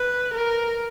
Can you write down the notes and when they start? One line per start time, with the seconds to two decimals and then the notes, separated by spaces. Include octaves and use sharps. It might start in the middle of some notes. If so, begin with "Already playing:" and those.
Already playing: B4
0.34 A#4